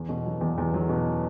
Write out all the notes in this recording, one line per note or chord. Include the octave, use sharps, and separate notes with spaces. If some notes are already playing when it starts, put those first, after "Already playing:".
Already playing: E2
B2
F#3
E2
E2
F#3
B2